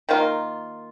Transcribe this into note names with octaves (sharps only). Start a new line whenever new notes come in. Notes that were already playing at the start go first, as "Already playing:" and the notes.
D#3 A#3 F4